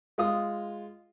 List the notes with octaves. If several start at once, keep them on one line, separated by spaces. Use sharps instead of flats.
G#3 F4 D#6